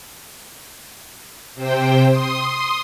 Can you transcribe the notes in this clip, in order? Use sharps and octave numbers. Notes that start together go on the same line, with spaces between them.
C3 C5 G5
C6 D#6